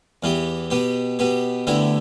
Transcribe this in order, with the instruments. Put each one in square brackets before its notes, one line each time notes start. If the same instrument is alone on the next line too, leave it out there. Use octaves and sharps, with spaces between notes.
[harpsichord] E2 E3 B3 G4
B2 B3 G4
B2 B3 G4
D2 D3 B3 E4 G4